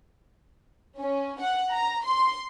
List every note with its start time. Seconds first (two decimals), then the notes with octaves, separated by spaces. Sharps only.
0.99 C#4
1.41 F#5
1.72 A#5
2.05 C6